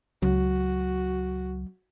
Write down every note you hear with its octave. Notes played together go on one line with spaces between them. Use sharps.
C#2 F#3 F#4